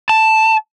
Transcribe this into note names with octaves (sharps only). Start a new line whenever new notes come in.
A5